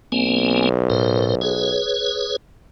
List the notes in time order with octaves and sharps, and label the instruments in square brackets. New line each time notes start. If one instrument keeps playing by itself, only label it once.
[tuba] B1 [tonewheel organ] A#3 C4 G#5
[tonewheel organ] A2 A#4 C5
G#4 B4 C#5